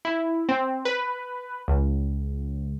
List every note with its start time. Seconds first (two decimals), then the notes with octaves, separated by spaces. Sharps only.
0.05 E4
0.49 C4
0.85 B4
1.68 C#2